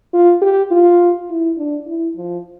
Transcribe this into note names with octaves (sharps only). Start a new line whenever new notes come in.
F4
G4
F4
E4
D4
E4
F3